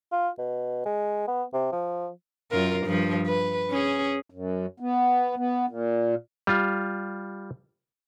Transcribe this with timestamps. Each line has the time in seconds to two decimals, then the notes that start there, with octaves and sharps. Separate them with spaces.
0.12 F4
0.39 B2
0.86 G#3
1.28 B3
1.53 C3
1.72 F3
2.51 F#2 F4 A#4
2.86 G2 F3
3.27 B4
3.70 C#4 G#4
4.30 F#2
4.80 B3
5.37 B3
5.68 A#2
6.47 G3 F4